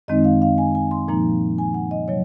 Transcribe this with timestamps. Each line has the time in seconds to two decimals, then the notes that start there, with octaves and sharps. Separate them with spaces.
0.08 F#2 D#3 G#3 C4 D#4 D#5
0.24 F5
0.42 F5
0.58 G#5
0.75 G#5
0.91 C6
1.08 A#2 F3 A#3 D#4 A#5
1.58 G#5
1.74 F#5
1.91 D#5
2.08 C3 F#3 C#5